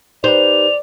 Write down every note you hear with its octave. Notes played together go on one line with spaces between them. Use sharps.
D#4 G4 B4 C5 D5 F7